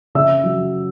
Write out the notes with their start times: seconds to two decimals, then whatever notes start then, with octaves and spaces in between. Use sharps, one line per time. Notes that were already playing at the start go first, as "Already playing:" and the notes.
0.15 C#3 E5 E6
0.44 F#3